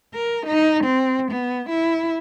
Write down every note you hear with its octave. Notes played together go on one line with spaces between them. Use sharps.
A#4
D#4
C4
B3
E4